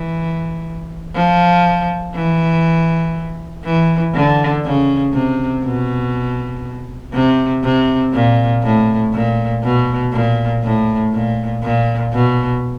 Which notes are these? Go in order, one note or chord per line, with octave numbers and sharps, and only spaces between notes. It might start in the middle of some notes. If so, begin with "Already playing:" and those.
Already playing: E3
F3
E3
E3
D3
C#3
C3
B2
C3
C3
A#2
A2
A#2
B2
A#2
A2
A#2
A#2
B2